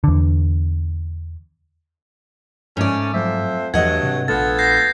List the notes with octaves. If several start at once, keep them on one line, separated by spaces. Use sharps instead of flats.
E2 D3
G#2 A3 C#4 D5
F2 F3 F#3 A3 C5 E5
E2 G2 E3 F#3 A3 D#5 F#5 G#6
G#2 C3
A#1 A3 B3 D4 F4 A4 A6
G6 A#6 C7